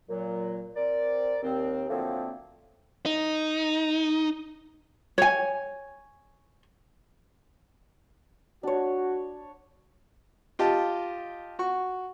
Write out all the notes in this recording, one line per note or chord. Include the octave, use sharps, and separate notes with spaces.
A#2 F#3
C4 A#4 D5
D#2 C4
D3 F3 F#3 A3 A#3 C4
D#4
C#5 G#5
D4 F#4 C#5
F4 G4 D#5 A5
F#4 C#6